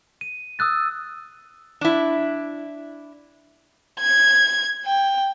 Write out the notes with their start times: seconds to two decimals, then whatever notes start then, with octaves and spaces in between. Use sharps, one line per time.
0.21 D#7
0.59 D#6 E6 F#6 A6
1.81 D4 E4
4.00 G#6
4.86 G5